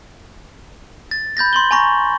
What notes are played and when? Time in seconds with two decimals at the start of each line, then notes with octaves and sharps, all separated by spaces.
1.11 A6
1.37 B5 G6 A6 A#6
1.53 C6 F#7 G7
1.71 G#5 A#5 C#6 A#6